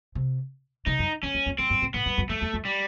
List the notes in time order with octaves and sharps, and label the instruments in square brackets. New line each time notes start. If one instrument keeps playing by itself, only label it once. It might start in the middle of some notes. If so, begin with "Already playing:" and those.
[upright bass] C3
[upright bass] C3 [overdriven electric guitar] D#4
[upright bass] F#2
[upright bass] E2 [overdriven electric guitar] C#4
[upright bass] E2
F2
[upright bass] F#2 [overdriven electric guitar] C4
[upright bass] G2
A2
[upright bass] A2 [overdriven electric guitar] B3
[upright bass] G2
F#2
[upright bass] F2 [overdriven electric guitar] A3
[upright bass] E2
F2
[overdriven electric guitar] G3